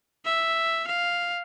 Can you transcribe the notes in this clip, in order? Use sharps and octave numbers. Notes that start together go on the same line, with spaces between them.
E5
F5